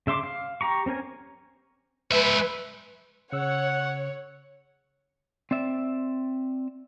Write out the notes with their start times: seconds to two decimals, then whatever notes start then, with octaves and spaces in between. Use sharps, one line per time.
0.07 C#3 E5 C6 D6
0.24 F5
0.61 G4 A#5 C#6
0.86 C4 C#4 A#4 G#5
2.12 G#3 B4 E5
3.33 C#3 C#5 F#5 E6
5.51 C4 D5 E5